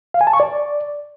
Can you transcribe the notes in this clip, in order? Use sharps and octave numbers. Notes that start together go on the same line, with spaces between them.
F5
G#5
A5
C#6
D5